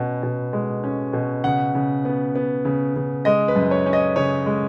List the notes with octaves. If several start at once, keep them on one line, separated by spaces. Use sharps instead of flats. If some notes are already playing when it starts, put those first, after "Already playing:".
Already playing: B2 C#4 F#5
B2
G#3
C#4
B2
C#3 F#5
C#3
B3
B3
C#3
C#3
G#3 D#5
B4
F#2
C#5
C#4
D#5
C#3 C#5
G#3